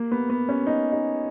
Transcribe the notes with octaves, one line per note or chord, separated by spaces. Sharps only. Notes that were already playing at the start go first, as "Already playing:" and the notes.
Already playing: A#3
B3
B3
C#4
D#4
D#4